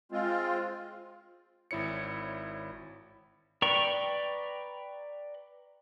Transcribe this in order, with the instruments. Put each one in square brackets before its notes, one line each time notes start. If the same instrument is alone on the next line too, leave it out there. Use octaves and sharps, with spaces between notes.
[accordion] G#3 C4 F4
[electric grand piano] G#1 E4 C#5 C#7
[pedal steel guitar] B4 D5 G5 A#5 C#6